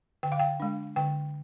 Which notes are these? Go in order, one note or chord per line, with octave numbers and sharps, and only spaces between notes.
D3 G5
F5
G5
G#3 D4
D3 G5